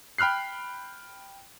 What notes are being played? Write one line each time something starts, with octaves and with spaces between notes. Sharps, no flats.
G5 B5 F6 F#6 C7